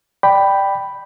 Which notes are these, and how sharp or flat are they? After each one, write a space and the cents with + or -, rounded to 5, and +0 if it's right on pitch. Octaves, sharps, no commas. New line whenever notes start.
D5 +15 G5 +0 B5 +0